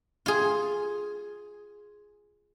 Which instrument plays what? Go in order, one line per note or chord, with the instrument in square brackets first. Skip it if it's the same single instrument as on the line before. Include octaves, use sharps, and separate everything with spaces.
[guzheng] F4 G#4